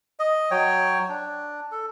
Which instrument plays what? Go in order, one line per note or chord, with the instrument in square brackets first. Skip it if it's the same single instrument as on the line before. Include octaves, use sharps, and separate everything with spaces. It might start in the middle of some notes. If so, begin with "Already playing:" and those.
[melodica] D#5
F#3 C#5 G5
D4
A4